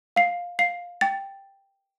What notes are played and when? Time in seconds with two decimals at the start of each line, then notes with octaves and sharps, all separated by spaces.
0.16 F5 C7
0.59 F5 C7
1.01 G5 A6